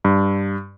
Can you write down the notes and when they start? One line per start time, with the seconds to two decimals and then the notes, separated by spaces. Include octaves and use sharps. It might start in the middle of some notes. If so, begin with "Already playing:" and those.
0.05 G2